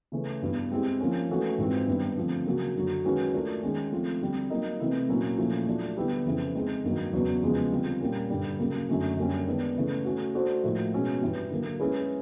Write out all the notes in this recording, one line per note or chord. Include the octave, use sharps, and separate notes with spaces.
C#3 E3 A3 C#4
G2 E3 G3 B3
G#3 C4 E4 G4
F3 A#3 C#4
E3 A3 C#4 F#4 A4
G#2 E3 G#3 C4 F4
G2 D#3 G3 B3 D4
D3 F3 A3 C4
C#3 F#3 A#3 C#4 F#4
F#2 D3 F#3
D#3 G#3 C#4 F#4 B4
A3 D4 F4 A#4
D#3 G#3 C#4
F3 A3 C4 F4
D3 G3 C4
F#3 A#3 D#4
C3 E3 A3 C4 E4
A#2 F#3 A#3 C#4 E4
A#2 F3 A3 C#4 E4
F#3 A3 D4 F4
D3 G3 B3 E4 G4
F2 C#3 E3
G#3 C4 D#4
G2 D#3 F#3 A#3 D#4
E2 C#3 F#3 B3 D4
E2 C#3 F3 G#3
D3 G3 C4 F4
A#2 G3 A#3 C#4
G2 D3 G3
C#3 F#3 A#3
F#2 D3 F#3 A3 C#4
F#2 D3 G3 A#3 C#4
D#3 G#3 B3 D4
C#3 E3 A3 D4
A3 C#4 F#4
A3 D4 F#4 A4 C5
A2 F3 A#3 D#4
B2 G#3 C#4 F#4
G2 E3 G3
D3 F#3 A#3
G#3 C#4 E4 G#4 B4